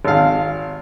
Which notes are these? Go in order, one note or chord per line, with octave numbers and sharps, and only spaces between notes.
G#1 F5